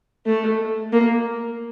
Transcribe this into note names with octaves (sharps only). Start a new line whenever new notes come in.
A3
A#3